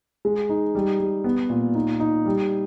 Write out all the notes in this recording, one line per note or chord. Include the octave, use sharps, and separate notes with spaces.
G#3
D#4
G3
G3
B3
A#2
D#4
D#4
G3